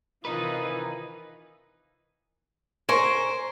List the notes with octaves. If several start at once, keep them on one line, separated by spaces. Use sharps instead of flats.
C3 D#3 E3 D#4 F4 B4 D#5
A#4 C5 G#5 C#6